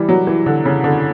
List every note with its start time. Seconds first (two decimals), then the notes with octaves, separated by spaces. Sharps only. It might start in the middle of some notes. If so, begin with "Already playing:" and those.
Already playing: E3 G3
0.09 F#3
0.27 E3
0.46 D3
0.65 C#3
0.84 D3